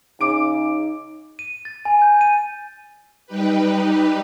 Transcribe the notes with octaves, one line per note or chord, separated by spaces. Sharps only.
C#3 D#4 D6 D7
D#7
A6
G#5
G6
D#7
G3 D#4 G4 B4